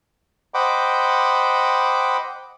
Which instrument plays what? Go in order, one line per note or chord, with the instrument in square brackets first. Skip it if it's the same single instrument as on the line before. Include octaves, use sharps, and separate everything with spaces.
[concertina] C5 D#5 F#5 G5 B5 D6